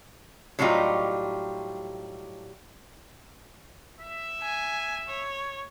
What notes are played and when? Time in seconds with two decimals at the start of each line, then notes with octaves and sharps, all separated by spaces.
0.59 A2 F#3 G3 D#4 F4 G4
4.01 E5
4.43 G#5
5.08 C#5